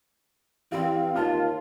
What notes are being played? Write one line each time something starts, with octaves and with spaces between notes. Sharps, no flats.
E3 C4 G4 D5 F5 C6
D#2 F4 A5 F6